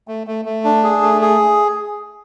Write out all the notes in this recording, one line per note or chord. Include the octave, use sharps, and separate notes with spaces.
A3
A3
A3
D4
G#4
A3
G#4